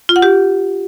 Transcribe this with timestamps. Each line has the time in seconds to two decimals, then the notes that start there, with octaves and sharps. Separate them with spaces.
0.09 F4
0.16 F#5
0.22 G4